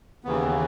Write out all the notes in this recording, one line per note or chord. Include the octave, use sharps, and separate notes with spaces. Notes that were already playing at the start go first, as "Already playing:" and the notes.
D#2 C#3 E3 B3